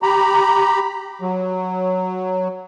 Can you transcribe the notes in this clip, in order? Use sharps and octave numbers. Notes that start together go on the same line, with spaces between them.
G4 A#5 B5
F#3